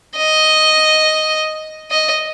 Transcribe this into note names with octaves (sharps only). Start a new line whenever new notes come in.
D#5
D#5